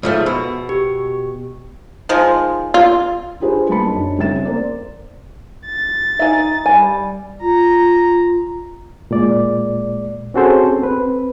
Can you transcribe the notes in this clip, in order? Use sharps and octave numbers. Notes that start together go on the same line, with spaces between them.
G#2 F3 A3
B2 E6
G4
D#3 F3 G#3
F4
D4 F4 G4 G#4 B4 C5
C2 A#3 A5 B5 C#7
F#2 D4 D#4
C2 C#3 C4 E5 A6 E7
A#3 C5 D5
A6
D#4 E5 G#5
G3 G#5
F4 A#5
A#2 G#3 D5
C4 C#4 F#4 G#4 A4 C5
C4 B4